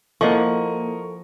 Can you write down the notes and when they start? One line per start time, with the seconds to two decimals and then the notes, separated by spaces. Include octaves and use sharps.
0.21 F3 A#3 E4 A4 A#4 D#5 F#5 C#6